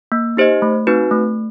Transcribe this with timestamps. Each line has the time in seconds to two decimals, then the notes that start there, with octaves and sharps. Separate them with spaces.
0.12 A#3
0.37 D#4 G4 C5 D#5
0.62 A3
0.87 C4 D#4 F#4 B4
1.11 A3